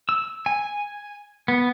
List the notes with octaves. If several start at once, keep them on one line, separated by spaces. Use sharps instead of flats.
E6
G#5
B3